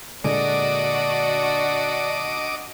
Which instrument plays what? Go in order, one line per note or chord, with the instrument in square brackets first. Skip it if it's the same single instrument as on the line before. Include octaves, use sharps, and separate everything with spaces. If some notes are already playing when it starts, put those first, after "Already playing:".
[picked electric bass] A#2 D3 G#3 [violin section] D4 F#4 [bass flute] D5 [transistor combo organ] D#5 D6